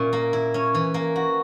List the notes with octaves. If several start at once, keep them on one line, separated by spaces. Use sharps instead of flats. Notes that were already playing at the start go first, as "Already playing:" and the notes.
Already playing: A#2 C#4 E4
A#3
E4
C#4
E3
A#3
F#4